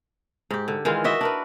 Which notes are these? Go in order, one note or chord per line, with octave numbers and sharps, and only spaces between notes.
G#2 G4
D3
D#3 E3 G#3 F4
F#4 D#5 E5
D4 A#4 B4